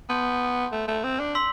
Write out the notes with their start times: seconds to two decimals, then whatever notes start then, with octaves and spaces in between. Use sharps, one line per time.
0.09 B3 A5 C6 G6
0.72 A3
0.88 A3
1.04 C4
1.20 D4
1.35 C6 E6 B6 F#7